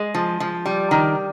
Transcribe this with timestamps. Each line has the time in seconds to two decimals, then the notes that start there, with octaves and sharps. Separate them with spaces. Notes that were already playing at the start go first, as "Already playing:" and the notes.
Already playing: G#3
0.14 F3
0.40 F3
0.66 G3
0.91 D#3